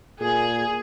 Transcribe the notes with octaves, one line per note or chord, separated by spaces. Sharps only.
A#2 G#4